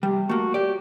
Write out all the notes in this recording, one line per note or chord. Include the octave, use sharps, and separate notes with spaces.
C3 G3
A3 A#3 F#4
G4 D5